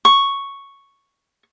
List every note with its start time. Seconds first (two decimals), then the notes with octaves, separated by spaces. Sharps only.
0.05 C#6